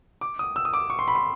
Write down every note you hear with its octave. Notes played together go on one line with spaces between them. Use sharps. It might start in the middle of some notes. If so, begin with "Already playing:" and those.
D6
D#6
E6
D#6
D6
C#6
C6
B5
C6